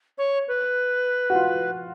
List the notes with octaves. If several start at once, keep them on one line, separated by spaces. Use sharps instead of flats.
C#5
B4
F#4
F4